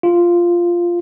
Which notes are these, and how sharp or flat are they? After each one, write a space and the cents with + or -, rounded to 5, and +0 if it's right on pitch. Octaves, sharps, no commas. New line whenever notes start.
F4 -5